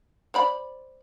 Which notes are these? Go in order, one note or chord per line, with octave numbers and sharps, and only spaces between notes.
C5 D5 B5